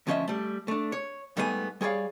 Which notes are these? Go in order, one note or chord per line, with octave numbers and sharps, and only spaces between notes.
D2 F3 C#4 C5 D#5 E5
G3 A3
A3 D4
C#5
G#2 G3 A3 B3 B4 G#5
G3 G#4 C#5 D5 F5